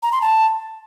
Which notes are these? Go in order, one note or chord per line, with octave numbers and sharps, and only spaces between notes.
A#5
C6
A5